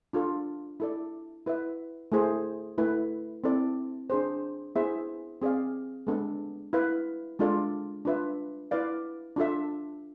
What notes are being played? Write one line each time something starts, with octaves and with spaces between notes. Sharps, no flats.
D4 F4 A4
E4 A4 D5
E4 B4 E5
A3 E4 G#4 C5
A3 E4 B4
C4 E4 A4 D5
D4 G#4 C5
B3 E4 G#4 C5 E5
C4 G#4 D5 F5
G#3 B3 D4 A4
E4 B4 F5
G#3 D4 F4 A4 D5
D4 F4 B4 E5
E4 B4 D5 F5
D4 F4 A4 E5